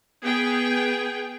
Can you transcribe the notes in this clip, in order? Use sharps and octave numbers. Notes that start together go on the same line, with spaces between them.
B3 G#4 G5